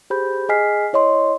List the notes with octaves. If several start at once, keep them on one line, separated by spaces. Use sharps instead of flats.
G4 G#4 C5 B5 G6
G#4 D#5 G#5 F6 B6 C7
E4 C#5 D#5 C6